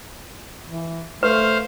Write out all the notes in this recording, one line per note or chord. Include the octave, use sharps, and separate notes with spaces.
E3
A3 B4 C5 F5